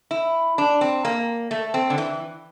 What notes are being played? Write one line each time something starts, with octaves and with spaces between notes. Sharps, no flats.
E4
D4
C4
A#3
A3
C4
D3
E3